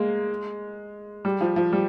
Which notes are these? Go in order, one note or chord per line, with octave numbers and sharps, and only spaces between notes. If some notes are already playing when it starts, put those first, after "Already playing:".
Already playing: G#3 A#3
G3
F3
F3
G3